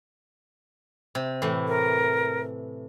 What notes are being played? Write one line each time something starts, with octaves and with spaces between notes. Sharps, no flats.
C3
A2 E3
A#4